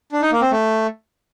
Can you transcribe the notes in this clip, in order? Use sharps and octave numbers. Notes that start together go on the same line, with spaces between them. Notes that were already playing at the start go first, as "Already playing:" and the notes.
D4
D#4
A#3
C4
A3